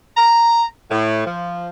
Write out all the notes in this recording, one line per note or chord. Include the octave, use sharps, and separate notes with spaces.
A#5
A2
F3